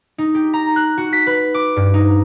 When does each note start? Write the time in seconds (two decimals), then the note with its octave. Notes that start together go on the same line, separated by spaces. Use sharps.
0.18 D#4
0.35 G4
0.53 A#5
0.76 F#6
0.98 F#4
1.13 B6
1.27 B4
1.54 D6
1.76 G2
1.94 D#4